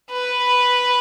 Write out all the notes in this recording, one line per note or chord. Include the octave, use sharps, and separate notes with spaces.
B4